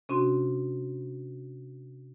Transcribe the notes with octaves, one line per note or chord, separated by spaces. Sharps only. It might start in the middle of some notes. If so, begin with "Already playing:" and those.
C3 C#4 D4 F#4 C6